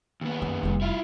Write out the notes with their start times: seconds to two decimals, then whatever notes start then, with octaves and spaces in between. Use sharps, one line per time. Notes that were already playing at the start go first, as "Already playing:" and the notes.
0.21 D#2 B3
0.42 F#2
0.63 F1 G3
0.81 E4 F4